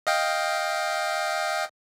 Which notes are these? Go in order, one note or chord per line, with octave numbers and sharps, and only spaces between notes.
D#5 F5 G5